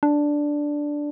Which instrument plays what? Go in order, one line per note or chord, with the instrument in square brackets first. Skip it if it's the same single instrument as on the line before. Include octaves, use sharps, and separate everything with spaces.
[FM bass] D4